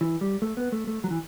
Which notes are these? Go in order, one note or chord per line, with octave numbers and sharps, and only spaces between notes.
E3
G3
A3
B3
A3
A3
F#3
E3